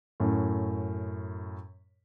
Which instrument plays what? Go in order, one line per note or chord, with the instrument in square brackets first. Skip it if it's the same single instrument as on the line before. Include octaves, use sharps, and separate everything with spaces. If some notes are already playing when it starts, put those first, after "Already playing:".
[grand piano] F#2 A2